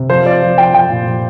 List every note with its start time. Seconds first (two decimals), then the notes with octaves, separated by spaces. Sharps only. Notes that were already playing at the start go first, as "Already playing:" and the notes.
Already playing: C3
0.09 F3 C5
0.25 F3 D5
0.42 F3
0.58 F3 G5
0.74 F3 G5
0.90 A#2
1.06 F3